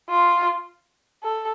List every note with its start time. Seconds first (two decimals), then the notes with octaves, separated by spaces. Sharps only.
0.10 F4
1.23 A4